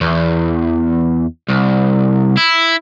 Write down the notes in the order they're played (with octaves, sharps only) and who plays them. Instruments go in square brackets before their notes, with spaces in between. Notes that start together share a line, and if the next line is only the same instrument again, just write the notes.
[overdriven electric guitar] E2
C2
E4